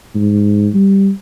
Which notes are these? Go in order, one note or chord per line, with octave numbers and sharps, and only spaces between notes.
G#2
G3